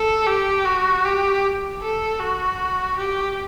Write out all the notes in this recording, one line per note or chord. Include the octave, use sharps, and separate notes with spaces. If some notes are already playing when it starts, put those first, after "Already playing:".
Already playing: A4
G4
F#4
G4
A4
F#4
G4